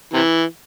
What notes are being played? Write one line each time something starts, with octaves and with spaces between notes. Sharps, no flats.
C3 E3